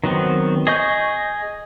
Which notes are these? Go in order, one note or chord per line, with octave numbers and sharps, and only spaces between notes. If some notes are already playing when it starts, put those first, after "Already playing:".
D#3 F#3 B3 C4
G#4 D#5 C#6 G6